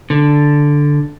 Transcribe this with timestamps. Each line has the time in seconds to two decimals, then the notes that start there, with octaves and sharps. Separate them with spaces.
0.10 D3